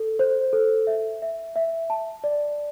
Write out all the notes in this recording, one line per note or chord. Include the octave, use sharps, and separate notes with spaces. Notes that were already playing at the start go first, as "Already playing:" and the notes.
Already playing: A4
C5
A4
E5
E5
E5
A5
D5